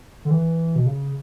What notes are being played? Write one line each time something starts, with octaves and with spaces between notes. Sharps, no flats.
D3
E3
B2
C#3